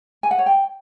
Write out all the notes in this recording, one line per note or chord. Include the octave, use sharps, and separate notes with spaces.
G#5
F#5
C#5
G5